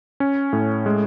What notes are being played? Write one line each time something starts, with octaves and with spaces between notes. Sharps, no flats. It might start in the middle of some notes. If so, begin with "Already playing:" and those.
C#4
A2
G#3